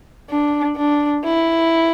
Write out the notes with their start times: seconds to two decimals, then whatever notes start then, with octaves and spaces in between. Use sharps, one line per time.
0.30 D4
0.76 D4
1.24 E4